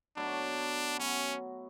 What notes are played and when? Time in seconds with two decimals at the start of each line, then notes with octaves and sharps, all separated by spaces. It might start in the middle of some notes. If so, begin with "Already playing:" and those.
0.16 B2 F#3 A3 D4 E4
0.98 F#3 B3 C#4 F#4